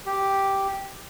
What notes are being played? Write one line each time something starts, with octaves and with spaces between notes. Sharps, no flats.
G4